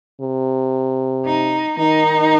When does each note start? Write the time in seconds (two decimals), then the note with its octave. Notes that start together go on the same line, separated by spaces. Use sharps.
0.21 C3
1.26 D#4
1.79 D#3 D#4